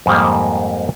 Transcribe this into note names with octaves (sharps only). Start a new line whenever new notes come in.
F2 G#2 D#3 G3 A#3